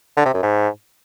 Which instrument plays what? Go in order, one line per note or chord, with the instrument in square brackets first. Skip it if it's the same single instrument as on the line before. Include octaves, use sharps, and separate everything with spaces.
[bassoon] D3
C3
F#2
G#2